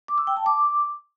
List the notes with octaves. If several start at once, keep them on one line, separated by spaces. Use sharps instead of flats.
D6
E6
G5
A5
D6